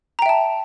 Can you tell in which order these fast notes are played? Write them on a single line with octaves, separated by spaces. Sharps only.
A#5 G5 E5 A5